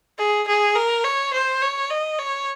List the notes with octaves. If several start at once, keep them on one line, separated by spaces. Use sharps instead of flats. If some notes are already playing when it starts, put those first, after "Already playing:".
G#4
G#4
A#4
C#5
C5
C#5
D#5
C#5